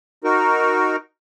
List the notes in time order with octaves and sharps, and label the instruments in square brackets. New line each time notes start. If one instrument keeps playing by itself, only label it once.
[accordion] D#4 F#4 A#4